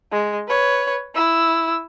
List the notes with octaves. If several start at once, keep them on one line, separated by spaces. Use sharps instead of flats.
G#3
B4 C#5
E4 E6